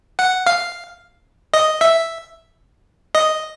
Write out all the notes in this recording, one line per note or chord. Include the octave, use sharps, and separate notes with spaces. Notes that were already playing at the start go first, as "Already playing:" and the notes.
F#5
F5
D#5
E5
D#5